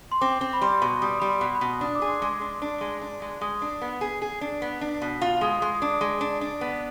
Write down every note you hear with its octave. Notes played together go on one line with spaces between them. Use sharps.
C6
C4 D6
C4
B5
G3 C6
B2
G3 D#6
G3 B5
C6
B2
B5
B2
D4 D#6
D6
G#4
C6
G#3 D6
D4
D4
G#3
D4
G#3
G#3 D#6
D4
B3
G#4
G#4
D4
B3
D4
B2
F4
G#3 D#6
G#3
D#6
D4 D6
G#3
D4
D4
B3